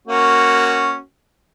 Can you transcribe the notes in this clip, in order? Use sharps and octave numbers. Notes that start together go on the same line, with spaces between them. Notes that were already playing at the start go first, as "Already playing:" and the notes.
A#3 C#4 F#4